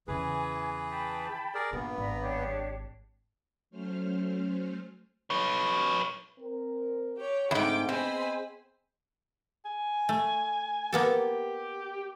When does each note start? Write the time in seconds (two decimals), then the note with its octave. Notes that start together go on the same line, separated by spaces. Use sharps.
0.08 E2 C#3 E3 G#4 B4 G#5
0.89 G5 A5 B5
1.55 G#4 A#4 D5
1.73 G2 A#2 B3
1.98 G#1 D5 A#5 B5
2.21 D4 G4 C#5
3.70 F#3 A3 C#4 C5 F6
5.30 B4 C#5
6.39 C4 A#4
7.16 G4 C#5
7.51 E2 G#2 D3 A3 C4 G5 D6
7.89 B3 C4 G#4 C5 D#5 G#5 B5
9.65 G#5
10.09 A3
10.93 A#3 B3 G4 A4